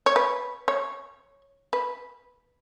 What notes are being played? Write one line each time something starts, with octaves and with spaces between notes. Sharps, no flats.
C#5
B4
C#5
B4